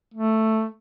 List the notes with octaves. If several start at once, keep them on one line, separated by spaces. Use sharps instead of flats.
A3